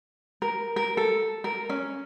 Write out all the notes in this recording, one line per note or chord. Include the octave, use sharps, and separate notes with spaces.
A#4
A#4
A4
A#4
C#4